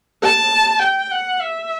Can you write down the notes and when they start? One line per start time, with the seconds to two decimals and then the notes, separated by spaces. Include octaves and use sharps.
0.23 A5
0.82 G5
1.12 F#5
1.41 E5